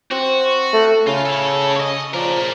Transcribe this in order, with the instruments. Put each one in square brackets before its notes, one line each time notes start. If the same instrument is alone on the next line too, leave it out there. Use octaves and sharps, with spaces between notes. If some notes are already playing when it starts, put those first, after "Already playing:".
[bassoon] C4 [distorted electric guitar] F#4
[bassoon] A3
[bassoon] C#3 [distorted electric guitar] F4
[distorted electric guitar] E4 A4
C#5 D#5
[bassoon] F3 [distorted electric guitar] A#4 D5